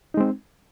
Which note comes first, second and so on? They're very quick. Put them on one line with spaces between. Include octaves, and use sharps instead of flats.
D#4 G#3 C4